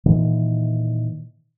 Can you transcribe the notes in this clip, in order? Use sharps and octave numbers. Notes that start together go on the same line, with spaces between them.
A#2 D#3 E3